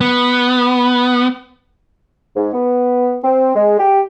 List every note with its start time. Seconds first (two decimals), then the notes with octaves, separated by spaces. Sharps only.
0.01 B3
2.36 G#2
2.53 B3
3.24 C4
3.56 G#3
3.79 G4